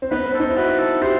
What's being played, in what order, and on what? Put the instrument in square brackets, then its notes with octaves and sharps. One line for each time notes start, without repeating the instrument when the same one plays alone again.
[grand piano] C4
[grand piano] B3 D#4 [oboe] B4
[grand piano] B3
[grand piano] C4 [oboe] A4
[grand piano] D#4
E4
[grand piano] D#4 F#4 [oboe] B4
[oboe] A4
[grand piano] E4 G4 [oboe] C5